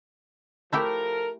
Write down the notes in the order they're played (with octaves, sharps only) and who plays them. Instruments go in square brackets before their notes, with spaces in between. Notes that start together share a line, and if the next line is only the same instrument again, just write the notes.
[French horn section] F3 A4 A#4 [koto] A3 E4 G4